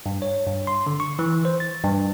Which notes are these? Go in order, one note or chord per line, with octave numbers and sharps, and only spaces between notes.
G2
C#5
G2
C6
D3
C#6
E3
C5
A6
G2